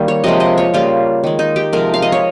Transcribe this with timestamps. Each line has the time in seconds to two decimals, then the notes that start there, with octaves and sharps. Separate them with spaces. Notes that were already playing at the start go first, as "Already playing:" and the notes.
Already playing: D#3 G3 A#3
0.08 C#5
0.24 C3 F3 G#3 D#5
0.40 D#5
0.58 C#5
0.74 C#3 G3 A#3 F4
1.24 D#3 G#3
1.39 D#4
1.56 G4
1.73 C3 F3 G#3 A#4
1.94 F5
2.02 D#5
2.12 C#5